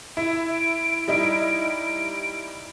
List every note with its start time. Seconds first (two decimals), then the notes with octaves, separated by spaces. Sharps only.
0.17 E4 D7
1.08 G3 D#4 E4